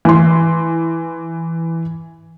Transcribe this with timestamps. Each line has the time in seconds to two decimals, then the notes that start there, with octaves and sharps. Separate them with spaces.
0.05 E3 C6